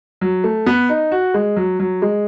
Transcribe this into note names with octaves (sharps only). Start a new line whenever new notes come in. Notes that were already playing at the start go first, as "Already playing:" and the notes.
F#3
A3
B3
D#4
F#4
G#3
F#3
F#3
G#3